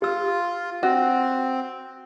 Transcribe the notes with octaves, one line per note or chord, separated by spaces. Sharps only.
F4 G4 E6
C4 F#4